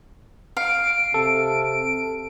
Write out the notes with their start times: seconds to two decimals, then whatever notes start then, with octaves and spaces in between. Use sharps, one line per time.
0.57 F5 D7
1.14 C3 A4